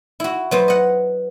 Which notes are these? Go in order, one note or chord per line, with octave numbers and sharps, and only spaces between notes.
E4 F#4
F#3 B3 C5
D#5 F#5